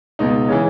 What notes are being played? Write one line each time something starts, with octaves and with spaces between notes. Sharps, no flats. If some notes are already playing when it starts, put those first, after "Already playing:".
C#2 B2 D#4
C#3 E3 C#4